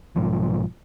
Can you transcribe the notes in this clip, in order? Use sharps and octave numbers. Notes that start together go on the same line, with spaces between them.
B1 G#2 F3